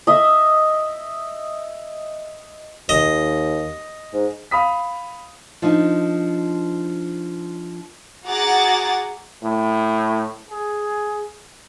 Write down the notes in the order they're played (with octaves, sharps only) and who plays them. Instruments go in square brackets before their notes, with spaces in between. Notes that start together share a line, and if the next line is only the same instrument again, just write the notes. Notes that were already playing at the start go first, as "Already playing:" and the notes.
[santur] D#5 E5
[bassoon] D#2 [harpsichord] D#5
[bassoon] G#2
[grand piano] F5 B5 D#6 B6
[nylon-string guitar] F3 D4 D#4
[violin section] F#4 G#4 F#5 A#5 D6 A6
[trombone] A2
G#4